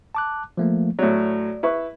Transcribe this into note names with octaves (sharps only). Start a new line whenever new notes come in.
A5 D6 F#6
F3 A3 A#3
A2 F#3 D5
E4 B4 C#6